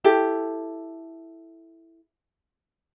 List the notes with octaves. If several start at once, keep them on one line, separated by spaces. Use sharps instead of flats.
E4 G4 A4